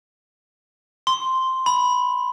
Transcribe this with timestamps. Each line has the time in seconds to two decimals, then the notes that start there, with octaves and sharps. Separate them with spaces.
1.07 C6
1.66 B5